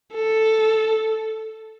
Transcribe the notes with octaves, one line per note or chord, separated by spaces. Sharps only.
A4